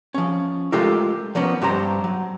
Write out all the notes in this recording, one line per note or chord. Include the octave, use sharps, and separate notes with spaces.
F3 C#4
G#3 A3 F4 G4 A4 A#4
F3 A#3 B3 C#4
G2 G4 C5 A#5
F#3